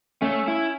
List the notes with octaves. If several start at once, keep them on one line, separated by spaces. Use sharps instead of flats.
A3 C#4
E4